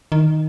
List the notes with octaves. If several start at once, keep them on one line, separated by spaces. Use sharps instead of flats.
D#3